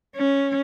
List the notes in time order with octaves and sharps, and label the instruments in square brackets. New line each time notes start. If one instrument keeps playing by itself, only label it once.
[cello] C#4